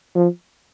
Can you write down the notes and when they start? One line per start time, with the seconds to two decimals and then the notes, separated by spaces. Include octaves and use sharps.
0.15 F3